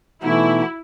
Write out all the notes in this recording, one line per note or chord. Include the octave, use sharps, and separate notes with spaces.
B2 E3 A3 B3 D#4 E4